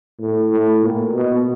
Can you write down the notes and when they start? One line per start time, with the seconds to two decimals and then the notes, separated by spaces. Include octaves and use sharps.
0.21 A2
0.52 A2
0.83 A#2
1.13 B2